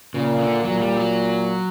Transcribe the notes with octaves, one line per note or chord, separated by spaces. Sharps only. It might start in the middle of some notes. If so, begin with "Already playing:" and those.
A#2 C#3
D3
A#2 F#3
G3
F#3